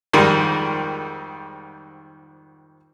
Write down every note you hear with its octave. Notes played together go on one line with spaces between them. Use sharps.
F2 G#2 D#3 G3 A#4 C6